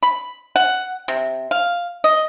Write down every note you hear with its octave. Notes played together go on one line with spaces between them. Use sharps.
B5
F#5
C3
F5
D#5